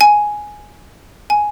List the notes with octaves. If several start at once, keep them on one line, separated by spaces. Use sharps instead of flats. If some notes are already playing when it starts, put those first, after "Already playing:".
G#5
G#5